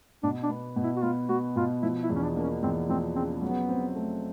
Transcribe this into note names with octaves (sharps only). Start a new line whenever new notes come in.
B2 D4
D4
B3
B2
E4
F#4
B3 F4
B3 F#4
B2 F4
F3 E4
E4
E2
C#4
D4
A#3 D4
C#4
E2 C4
F3 C4
C#3 C4
F#3 B3
C4
A3